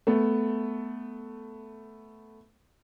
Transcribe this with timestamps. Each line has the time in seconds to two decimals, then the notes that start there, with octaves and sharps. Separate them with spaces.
0.07 A3 B3